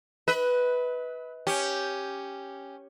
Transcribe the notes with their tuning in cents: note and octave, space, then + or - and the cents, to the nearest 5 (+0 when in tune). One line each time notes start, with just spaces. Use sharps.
B4 +0 D#5 +45
C#4 +0 G4 +0